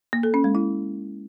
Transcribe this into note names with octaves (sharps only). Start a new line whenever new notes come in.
A#3
A4
C#4
G#3
E4